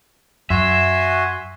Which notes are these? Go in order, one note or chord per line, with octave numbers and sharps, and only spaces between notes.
F#2 F#4 E5 G#5 C6